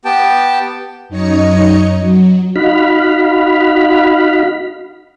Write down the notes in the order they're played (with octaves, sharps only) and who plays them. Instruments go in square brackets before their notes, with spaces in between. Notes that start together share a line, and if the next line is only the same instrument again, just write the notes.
[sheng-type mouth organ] B3 G4 G5 A5
[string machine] F#2 D#4 C#5 D#5 C#7
F#3
[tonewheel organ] D#4 F#4 F5 B5